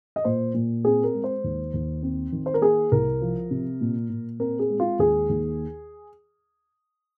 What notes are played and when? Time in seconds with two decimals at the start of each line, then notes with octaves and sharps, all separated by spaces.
0.16 D#5
0.25 A#2 C5
0.54 A#2
0.85 C4 G#4
1.04 A#4
1.14 G#3
1.24 C5
1.44 D#2
1.74 D#2
2.03 C4
2.32 D#3
2.46 C5
2.54 A#4
2.61 A#3 G#4
2.92 C2 A#4
3.21 F3
3.51 C3
3.81 A#2
4.10 A#2
4.40 C4 A#4
4.59 G#4
4.70 G#3
4.80 F4
4.99 D#2 G#4
5.29 D#2